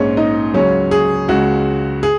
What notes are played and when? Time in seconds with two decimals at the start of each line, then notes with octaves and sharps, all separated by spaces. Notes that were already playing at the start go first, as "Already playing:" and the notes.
Already playing: A#1 G#2 G#3 C#4 C#5
0.17 D#4 D#5
0.54 C#2 C#3 F#3 C#4 C#5
0.91 G#4
1.28 C#2 C#3 G#3 F#4
2.03 G#4